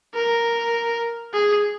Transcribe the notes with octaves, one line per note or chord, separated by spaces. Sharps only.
A#4
G#4